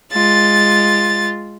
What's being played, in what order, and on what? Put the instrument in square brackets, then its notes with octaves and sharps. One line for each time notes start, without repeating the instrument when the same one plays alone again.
[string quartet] G#3 F4 A6